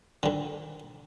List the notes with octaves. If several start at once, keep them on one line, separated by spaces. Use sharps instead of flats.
D3 D#3